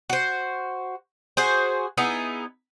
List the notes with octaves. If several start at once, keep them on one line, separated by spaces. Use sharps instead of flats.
F#4 C5
F#4 G#4 C5
B3 D#4 E4 G#4